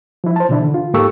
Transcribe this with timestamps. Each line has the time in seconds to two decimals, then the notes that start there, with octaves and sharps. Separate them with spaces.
0.24 F3 E4
0.36 C5 A5
0.49 B2 D3 E3 D4 E4
0.62 D3
0.74 F4
0.94 G#2 A#3 G4 A4 C#6 E6